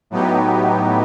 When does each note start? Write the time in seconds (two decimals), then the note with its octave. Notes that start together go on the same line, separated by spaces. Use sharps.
0.10 A2 F#3 B3 D#4 G4